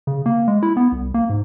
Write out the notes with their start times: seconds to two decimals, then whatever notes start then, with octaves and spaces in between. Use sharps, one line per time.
0.07 C#3
0.26 A#3
0.48 G#3
0.63 E4
0.77 B3
0.92 C2
1.14 A#3
1.30 G#2